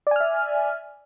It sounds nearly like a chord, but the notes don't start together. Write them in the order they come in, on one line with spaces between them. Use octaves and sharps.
D5 G#5 F6 E5